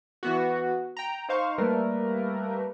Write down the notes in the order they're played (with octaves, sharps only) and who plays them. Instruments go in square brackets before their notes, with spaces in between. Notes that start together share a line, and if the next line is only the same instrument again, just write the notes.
[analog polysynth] E3 B3 F#4
G5 A#5
D#4 C5 F5 C#6
G3 A3 A#3 A#4 B4